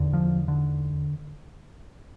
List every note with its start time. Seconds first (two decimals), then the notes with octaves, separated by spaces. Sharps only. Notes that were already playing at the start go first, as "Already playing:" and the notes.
Already playing: E2 D3
0.13 F3
0.48 D3